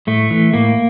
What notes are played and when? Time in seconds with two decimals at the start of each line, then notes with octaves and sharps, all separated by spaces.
0.07 A2 A3
0.31 E3
0.54 A2 A#3